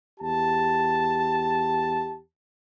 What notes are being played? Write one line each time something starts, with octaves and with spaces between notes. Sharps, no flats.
E2 G4 A5